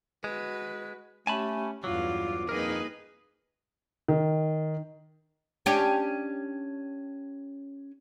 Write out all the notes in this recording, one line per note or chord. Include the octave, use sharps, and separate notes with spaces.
G#3 F#4 B4
A3 C#4 G4 G#5 A5 B5
E2 G2 F#3 F4 F5 D6
F2 A#3 D#4 G#4 A#4 B4 D#5
D#3
C#4 D4 G4